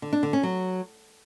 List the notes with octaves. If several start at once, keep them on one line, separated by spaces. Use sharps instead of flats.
D3
D4
D3
C#4
F#3